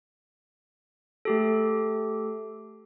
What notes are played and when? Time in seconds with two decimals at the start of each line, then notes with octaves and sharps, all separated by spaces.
1.25 A3 G4 A4